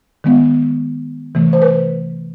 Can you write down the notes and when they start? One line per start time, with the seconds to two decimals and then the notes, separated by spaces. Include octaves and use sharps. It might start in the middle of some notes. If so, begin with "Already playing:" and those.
0.24 D#3 G#3 B3
1.35 C3 E3 A3
1.53 C5
1.62 B4